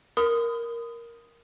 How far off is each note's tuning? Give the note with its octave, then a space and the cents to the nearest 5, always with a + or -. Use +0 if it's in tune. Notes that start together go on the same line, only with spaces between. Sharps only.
A#4 +0 B5 +45 D#6 +0